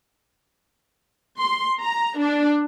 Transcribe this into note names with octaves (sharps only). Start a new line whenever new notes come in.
C6
A#5
D4